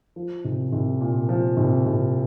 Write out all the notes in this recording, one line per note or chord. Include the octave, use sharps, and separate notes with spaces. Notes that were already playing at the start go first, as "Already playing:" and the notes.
F3
C2
C2
A#2
F3
C2
C2